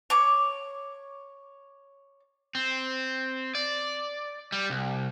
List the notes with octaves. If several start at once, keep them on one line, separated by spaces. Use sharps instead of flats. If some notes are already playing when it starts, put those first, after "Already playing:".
C#5 D6
C4
D5
G3
C2